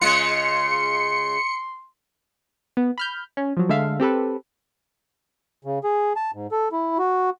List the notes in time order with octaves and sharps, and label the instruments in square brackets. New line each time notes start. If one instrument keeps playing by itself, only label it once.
[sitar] C#3 G#3 F4 [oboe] C6 [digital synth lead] C#7
[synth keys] B3
B5 F6 G6
C#4
F3 F#3
D3 G#3 A3 A4 E5 F5
C4 G4 A4 B4
[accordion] C#3
G#4
A5
G#2
A4
E4
F#4